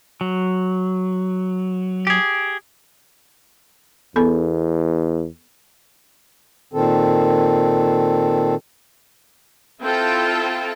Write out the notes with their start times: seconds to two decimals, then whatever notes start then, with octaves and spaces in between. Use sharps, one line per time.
0.21 F#3
2.07 G4 G#4
4.16 E2 B3 A4 B5
6.73 A#2 D#3 C4 A4
9.81 C4 E4 F4 A4 G5 A5